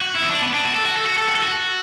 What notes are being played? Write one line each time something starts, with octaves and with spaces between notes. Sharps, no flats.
F#4
E4
B3
D4
B3
D4
F#4
A4
F#4
A4
F#4
A4
F#4
A4
F#4